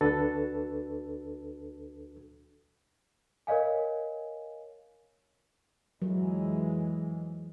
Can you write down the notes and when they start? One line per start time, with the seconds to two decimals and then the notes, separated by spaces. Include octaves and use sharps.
0.01 D2 D4 F#4 A4 B4 A6
3.47 A#4 C#5 D#5 F5 G#5
6.02 F2 E3 F#3 G#3